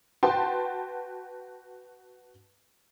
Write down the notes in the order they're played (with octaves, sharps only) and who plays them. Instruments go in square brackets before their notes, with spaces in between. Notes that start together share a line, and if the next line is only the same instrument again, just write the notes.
[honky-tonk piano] F#4 B4 G5 A5 C6